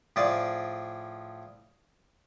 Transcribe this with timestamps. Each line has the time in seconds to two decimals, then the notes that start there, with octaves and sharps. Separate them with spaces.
0.16 A2 F3 G#4 D5